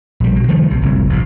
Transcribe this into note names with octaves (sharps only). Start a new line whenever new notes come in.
A#1 G3
B2
D#3 F3 G3 A3
B1 C3
F#1 C2 F2
A#1 B2